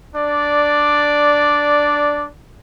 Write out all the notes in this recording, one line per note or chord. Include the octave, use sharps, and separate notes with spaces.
D4 D5